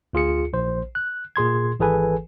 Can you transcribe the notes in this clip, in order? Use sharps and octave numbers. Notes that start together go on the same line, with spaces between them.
D2 F4 G#4 C#7
A#1 C5
F#6
A#2 G#4 C6 G#6
G#1 E3 G#4 A4 B4 G#5